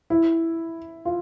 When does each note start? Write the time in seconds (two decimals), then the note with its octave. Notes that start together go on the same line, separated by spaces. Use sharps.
0.10 E4
1.05 F4